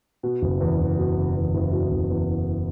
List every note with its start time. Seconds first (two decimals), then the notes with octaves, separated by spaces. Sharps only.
0.23 B2
0.42 F#1
0.60 E2
0.80 F#1
0.98 B2
1.16 F#1
1.36 E2
1.54 F#1
1.72 B2
1.91 F#1
2.10 E2